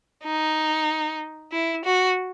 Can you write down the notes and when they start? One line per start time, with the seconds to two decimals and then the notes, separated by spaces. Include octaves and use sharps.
0.24 D#4
1.52 E4
1.85 F#4